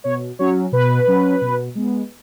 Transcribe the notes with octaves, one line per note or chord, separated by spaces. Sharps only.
B2 C#5
F#3 C#4 C#5
B2 B4
F#3 C#4
B2
G#3 B3